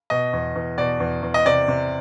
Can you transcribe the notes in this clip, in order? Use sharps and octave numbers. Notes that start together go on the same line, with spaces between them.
B2 D#5
E2
E2
B2 D5
E2
E2
D#5
C3 D5
C3